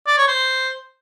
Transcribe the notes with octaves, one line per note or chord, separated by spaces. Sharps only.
D5
C#5
C5